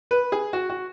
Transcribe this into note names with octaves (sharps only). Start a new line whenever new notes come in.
B4
G#4
F#4
F#4